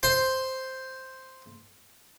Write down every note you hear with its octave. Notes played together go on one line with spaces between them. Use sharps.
C5 C6